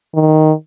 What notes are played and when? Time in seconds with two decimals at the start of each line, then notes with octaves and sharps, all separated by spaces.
0.14 D#3